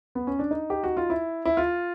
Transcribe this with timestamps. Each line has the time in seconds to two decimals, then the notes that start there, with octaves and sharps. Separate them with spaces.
0.15 B3
0.27 C#4
0.39 D4
0.51 D#4
0.70 G4
0.84 F#4
0.97 F4
1.10 E4
1.45 E4
1.57 F4